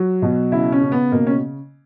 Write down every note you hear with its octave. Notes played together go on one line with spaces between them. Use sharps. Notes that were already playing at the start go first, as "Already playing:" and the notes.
Already playing: F#3
B2
C#3 E4
C#4
C#3
B3
B2 A#3
C#4